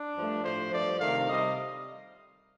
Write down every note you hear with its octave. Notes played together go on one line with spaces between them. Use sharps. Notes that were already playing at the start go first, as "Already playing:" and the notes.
Already playing: D4
G2 F3 A3
A2 F3 A3 C5
G2 F3 A3 D5
C3 D#3 A3 F5
C3 G3 D#5